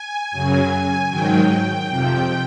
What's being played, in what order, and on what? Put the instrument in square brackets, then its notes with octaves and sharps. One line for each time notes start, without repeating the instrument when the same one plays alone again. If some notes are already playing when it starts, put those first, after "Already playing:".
Already playing: [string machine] G#5
F#2 C#3 F#3
G#2 D#3 F#3 G5
F2 C3 F3